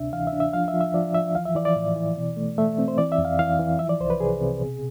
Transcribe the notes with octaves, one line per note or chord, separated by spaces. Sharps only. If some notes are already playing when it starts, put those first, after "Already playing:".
Already playing: D2 C3 D4 E5
E3 F5
E5
D4
E5
F3 F5
E5
F3
E5
F3 D5
F3 E5
E3 F5
E5
E3 D5
D5
A2
E3
B2
A3
A3 E5
C4
C5
E3 D5
E5
F2
F5
E3 F5
E3
F3 E5
D5
C2 C5
B4
C3 G#4
C3
B2